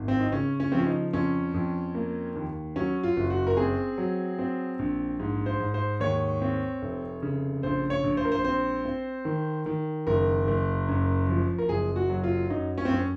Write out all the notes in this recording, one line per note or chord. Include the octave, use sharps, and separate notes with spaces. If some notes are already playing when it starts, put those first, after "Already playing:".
Already playing: G#1
C4
D#4
C#3 C#4
C#4
F3 C4
C#4
D#4
F2 C#4
F2
A#3
D#2
F#3 C#4
F4
F#1
F#4
A#4
C4 G#4
F#3
C4
A#1
G#2
C5
G#2
C5
D#2 C#5
C4
F1
C#3
A#1 C5
C#5
A#1
C5
A#4
C5
C4 C5
C4
D#3
D#3
F#1 A#4
F#1
F#2
F3
A#4
F#1 G#4
F#4
F#3
F4
F#2 D#4
C#4
C4
F#2 C#4